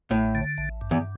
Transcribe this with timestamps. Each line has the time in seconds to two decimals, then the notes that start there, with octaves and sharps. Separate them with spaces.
0.10 A1 A2
0.35 D3
0.58 A1
0.81 G2
0.91 E2